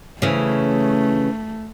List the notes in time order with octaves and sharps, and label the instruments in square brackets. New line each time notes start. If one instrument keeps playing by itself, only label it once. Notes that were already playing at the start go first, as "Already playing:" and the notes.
[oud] C#3 E3 [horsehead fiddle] A3